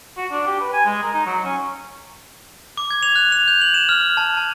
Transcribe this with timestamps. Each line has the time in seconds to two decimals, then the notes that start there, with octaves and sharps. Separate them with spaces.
0.17 F#4
0.31 D4
0.47 G4
0.61 B4
0.73 G#5
0.85 G#3
1.02 A#4
1.13 D#4
1.26 F#3
1.44 C#4
2.77 D6
2.91 G#6
3.03 F7
3.16 F#6
3.32 F7
3.48 G6
3.61 F#7
3.74 E7
3.89 F6
4.02 F6
4.17 A5
4.37 A5